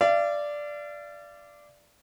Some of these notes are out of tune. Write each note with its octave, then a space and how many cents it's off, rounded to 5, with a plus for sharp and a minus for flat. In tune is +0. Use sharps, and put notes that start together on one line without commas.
D5 +0 F5 -40